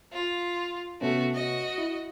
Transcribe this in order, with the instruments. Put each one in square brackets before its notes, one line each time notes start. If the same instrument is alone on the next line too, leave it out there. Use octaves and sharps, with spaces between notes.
[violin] F4
[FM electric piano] C3 B3 C#4 [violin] A3 F#4
[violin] F#4 D#5
[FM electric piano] E4